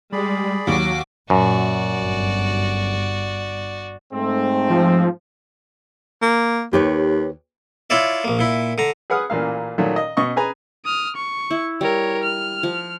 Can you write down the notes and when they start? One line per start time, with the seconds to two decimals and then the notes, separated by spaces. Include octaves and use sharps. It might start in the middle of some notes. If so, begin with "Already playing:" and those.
0.12 G3 G#3 G#4 D5 B5
0.67 D#2 F#3 F#4 D6
1.30 F#2 A#2 F#4 D5
1.99 G1
4.13 G#2 A3 C4
4.70 F3
6.22 A#3
6.73 D#2 G4 B4 C#5
7.90 E4 F4 C#5 D5 E5
8.24 A#1 A#3
8.39 A#2 E4
8.78 D3 A#5
9.10 G#4 B4 F#5 D#6 F6
9.30 A1 A#2 A#3 F5
9.78 A#2 D#3 F#3 A3
9.96 D#5
10.17 B2 D#5 C#6
10.36 G#4 B4 G#5 A#5
10.85 D#6 F6
11.16 C#6
11.51 E4
11.81 G3 A#4 C#5
12.23 F6
12.63 F3